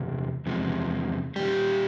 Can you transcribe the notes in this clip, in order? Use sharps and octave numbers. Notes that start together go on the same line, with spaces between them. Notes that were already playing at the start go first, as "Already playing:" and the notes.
Already playing: E2 C3
E2 C3 F3 G#3
A#2 G3 G4